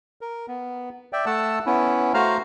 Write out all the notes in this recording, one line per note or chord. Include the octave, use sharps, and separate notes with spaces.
A#4
B3
D5 E5 G5
A3 F#5 A5 E6
B3 C#4 E4
A3 F#4 C5 F5 A#5 F6